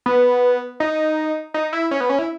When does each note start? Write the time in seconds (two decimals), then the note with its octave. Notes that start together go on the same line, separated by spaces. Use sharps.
0.06 B3
0.80 D#4
1.54 D#4
1.73 E4
1.91 C#4
2.01 B3
2.09 C#4
2.19 E4